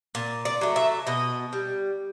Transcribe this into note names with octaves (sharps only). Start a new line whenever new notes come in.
A#2
D5
F#3 A3
E5
B2 D#5
G3